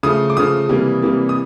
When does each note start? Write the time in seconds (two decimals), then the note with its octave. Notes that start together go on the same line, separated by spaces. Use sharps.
0.03 C#3 F3 A3 D#6
0.30 D6
0.37 C#3 F3 A3 D#6
0.69 C3 E3 G3 A#3
1.02 C3 E3 G3 A#3
1.29 D#6